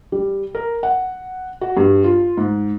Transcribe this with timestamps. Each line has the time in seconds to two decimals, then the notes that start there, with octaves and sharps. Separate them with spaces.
0.12 G3
0.55 A#4
0.83 F#5
1.61 F#4
1.77 G2
2.04 F4
2.37 G#2